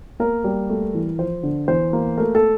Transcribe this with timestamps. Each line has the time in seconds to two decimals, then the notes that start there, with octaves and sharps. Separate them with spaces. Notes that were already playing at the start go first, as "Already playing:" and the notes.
0.20 A#3 A#4
0.44 G3
0.70 A3
0.94 E3
1.18 F3 C5
1.43 D3
1.68 E2 C5
1.93 A#3
2.18 A3 A#4
2.35 A4